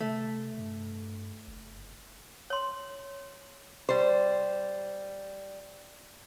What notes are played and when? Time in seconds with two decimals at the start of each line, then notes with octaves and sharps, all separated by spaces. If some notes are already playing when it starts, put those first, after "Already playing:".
0.01 C3 A3
0.58 G2
1.48 F#1
2.50 C#5 C6
3.89 G3 C5